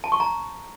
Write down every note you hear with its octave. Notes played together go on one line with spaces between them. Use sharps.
A5
C#6
A#5